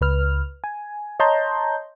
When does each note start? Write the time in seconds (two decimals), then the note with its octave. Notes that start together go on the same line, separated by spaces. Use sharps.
0.01 C#2 B4 F6
0.64 G#5
1.20 C#5 D#5 A5 A#5 C6 G6